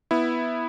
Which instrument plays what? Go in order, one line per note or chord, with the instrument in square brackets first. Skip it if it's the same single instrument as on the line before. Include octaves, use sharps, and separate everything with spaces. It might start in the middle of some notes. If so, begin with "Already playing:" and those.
[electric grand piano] B3 E4